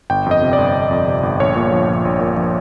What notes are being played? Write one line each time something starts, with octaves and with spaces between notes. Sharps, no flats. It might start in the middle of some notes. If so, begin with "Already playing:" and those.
G1 G5
F2 D#5
C3
D5
G1
G1
F2
C3
G1
A#1 C#5
A#2
F3
A#1
A#1
A#2
F3